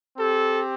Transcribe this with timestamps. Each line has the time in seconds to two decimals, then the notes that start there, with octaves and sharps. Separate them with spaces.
0.16 C4 G4 A4